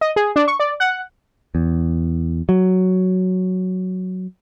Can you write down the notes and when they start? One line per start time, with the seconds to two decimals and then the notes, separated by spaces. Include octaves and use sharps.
0.01 D#5
0.16 G#4
0.36 D4
0.48 C#6
0.60 D5
0.80 F#5
1.55 E2
2.49 F#3